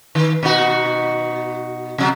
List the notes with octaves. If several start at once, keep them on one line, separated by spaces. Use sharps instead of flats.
D#3
B2 D#4 F#4
C3 F#3